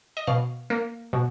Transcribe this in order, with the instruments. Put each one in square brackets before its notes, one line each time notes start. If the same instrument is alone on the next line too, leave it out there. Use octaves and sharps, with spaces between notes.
[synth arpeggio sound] D#5
B2 F5
A#3
B2